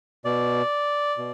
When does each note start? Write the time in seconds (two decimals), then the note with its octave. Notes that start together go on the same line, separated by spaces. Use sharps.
0.25 B2 D5
1.18 B2